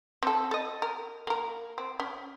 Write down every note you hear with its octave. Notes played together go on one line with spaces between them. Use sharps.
C4 A4
A4 D#5
A#4
A#3 A#4
C4
C#4